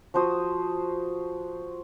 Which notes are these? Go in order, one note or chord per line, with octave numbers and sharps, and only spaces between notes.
F3 F#4 C5 D#6